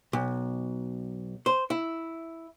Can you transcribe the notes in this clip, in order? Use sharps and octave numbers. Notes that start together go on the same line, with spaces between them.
B1
C5
E4